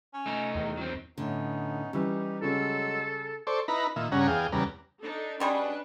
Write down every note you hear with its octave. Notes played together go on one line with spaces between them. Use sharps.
C#4
A3 D#4
E2 D#3
F#3 C4
A2 D3 B3 C#4 D#4
E3 G3 C#4 D#4 G4
C#3 F#3 G#3 C#4 A4 E6
A4 C5 D5 C#6
D#4 E4 B4 A#5 B5
A#2 D#3 E5
G2 C#3 C#4 F#5 A#5
E2 G#4 F5 G5
E2 C#3 G3 B4 A#5
D4 D#4 A4
B2 G3 C#4 D4 G#4 B4